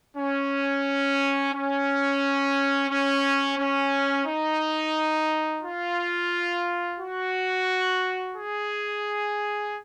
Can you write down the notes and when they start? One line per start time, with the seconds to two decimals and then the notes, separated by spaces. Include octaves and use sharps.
0.17 C#4
1.54 C#4
2.90 C#4
3.58 C#4
4.26 D#4
5.63 F4
6.99 F#4
8.36 G#4